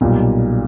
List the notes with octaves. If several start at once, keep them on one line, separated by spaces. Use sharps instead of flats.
B1 A#2 G3